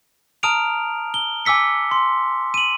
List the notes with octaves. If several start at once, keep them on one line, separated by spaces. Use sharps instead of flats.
A5 A#5 D#6 F6 D7 F7
G7
G#5 D6 E6 B6 C#7
C6
D#7 F#7